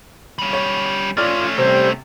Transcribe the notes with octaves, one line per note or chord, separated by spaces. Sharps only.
G3 C#4
C#5
A3 C#4 F4 D5 F6 A6
C3 G3 C5